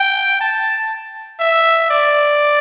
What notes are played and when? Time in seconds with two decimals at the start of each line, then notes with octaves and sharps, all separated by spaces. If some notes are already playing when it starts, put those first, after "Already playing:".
Already playing: G5
0.41 A5
1.40 E5
1.90 D5